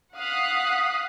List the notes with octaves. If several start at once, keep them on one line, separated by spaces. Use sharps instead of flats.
F5 F#5 D#6 F#6 B6